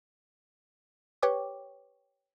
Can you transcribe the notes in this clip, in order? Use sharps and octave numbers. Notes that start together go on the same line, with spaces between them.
G4 B4 C#5 G5 C#6 D6